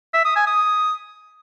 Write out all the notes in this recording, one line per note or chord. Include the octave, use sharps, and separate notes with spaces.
E5
D#6
G#5
D#6